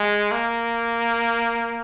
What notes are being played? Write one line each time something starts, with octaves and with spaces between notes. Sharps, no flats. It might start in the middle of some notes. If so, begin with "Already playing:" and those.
Already playing: G#3
A#3